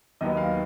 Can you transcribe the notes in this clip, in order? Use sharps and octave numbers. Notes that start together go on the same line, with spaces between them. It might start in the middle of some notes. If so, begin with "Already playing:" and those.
D#2 D#3 F#3 B3 D#5
F5